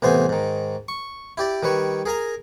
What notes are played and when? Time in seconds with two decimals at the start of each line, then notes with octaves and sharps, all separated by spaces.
0.02 C2 A2 E3 B3 C5 G#5
0.29 G#2 D#3
0.88 C#6
1.37 E4 G4 D5
1.63 D#3 G3 B4 C#5
2.06 G#4 A#4 G#5 A#5